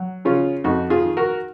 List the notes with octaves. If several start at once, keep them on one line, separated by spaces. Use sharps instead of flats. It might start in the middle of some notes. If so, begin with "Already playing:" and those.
Already playing: F#3
C#3 C#4 F4
F2 D#4 F#4
F4 G#4
D#3
F#4 A#4